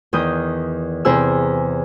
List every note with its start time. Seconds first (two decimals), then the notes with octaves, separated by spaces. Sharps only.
0.13 E2 D#3 D#6 G6
1.05 E2 C3 C4 G#4 E6